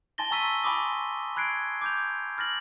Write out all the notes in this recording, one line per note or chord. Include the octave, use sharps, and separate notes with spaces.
G#5 A5 C6 A6 A#6 G7
G#5 A#5 C#6 E6 B6 D#7
G#5 B5 C6 D6 D#6 A#6
B5 F#6 G#6 C7 D7
D6 G6 F7
B5 F6 A6 A#6 F#7